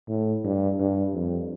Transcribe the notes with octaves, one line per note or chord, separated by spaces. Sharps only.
A2
G2
G2
F2